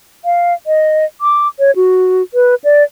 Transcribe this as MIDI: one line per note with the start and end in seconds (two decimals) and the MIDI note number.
0.25 0.54 77
0.67 1.05 75
1.21 1.48 86
1.59 1.71 73
1.76 2.22 66
2.34 2.55 71
2.64 2.83 74